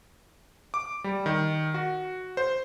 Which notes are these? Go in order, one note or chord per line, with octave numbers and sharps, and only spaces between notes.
D6
G3
D#3
F#4
C5